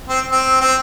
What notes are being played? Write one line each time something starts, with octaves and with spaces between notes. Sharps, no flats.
C4
C4
C4